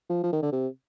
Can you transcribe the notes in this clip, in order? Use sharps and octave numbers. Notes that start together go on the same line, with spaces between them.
F3
F3
D#3
D3
C3